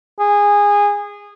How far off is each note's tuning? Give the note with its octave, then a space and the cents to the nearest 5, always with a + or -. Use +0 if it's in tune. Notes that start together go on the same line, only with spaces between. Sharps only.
G#4 -20